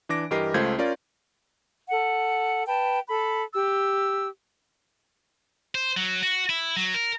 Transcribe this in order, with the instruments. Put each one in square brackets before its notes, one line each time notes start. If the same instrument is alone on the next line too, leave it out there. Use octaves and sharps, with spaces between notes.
[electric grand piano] E3 D4 D6 A#6 D7
G2 E3 G4 A#4 D#5 C7
C#2 A3 F4 C5 G6 G#6
C#4 F4 A#4 D5
[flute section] A4 F#5
B4 G5 A5
A4 B5
G4 E6
[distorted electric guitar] C5
F#3
F#4
E4
F#3
A#4